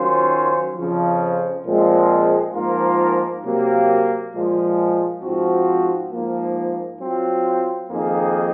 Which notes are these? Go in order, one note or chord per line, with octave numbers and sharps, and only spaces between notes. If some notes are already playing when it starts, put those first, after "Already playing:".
Already playing: D#3 F#3 C#4 F4 C5
F2 C#3 F3
A#2 F3 G#3 C4
G#2 F3 A#3 F4 A#4
C3 F#3 A#3
A#2 F3 G#3
G#2 F3 C4 F#4
G#2 F3 A#3
F#3 C4 F4
F2 D#3 A#3 D#4 G#4